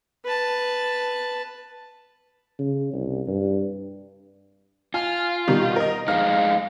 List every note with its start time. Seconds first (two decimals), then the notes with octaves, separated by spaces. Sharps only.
0.24 B4 A5
2.59 C#3
2.93 C2
3.27 G2
4.94 F4 G#5 F6
5.48 B2 D#3 G3 A#5
5.76 A#4 D#5
6.08 F2 G#3 D#4 F5 F6